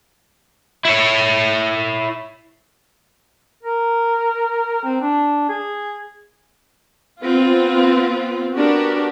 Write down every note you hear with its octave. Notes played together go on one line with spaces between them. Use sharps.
E4 C#5
A#4
C4
D4
G#4
B3 C4 F4
B3 D4 F#4 G4 A#4